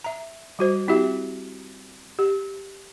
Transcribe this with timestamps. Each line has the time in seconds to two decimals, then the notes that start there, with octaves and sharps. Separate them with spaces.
0.04 E5 A#5
0.59 G3 F#4 C5
0.88 C4 E4 F#4 G4 E5
2.19 G4